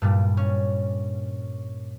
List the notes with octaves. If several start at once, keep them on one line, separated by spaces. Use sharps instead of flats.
G2 A#2 G3
C#4